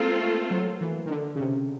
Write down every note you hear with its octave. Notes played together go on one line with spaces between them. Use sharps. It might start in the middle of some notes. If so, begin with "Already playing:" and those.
Already playing: G#3 A#3 C4 F4 A4
A3
F#3
E3
D#3
D3
C#3
C3